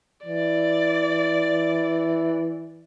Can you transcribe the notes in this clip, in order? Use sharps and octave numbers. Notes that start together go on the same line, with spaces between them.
E3 D5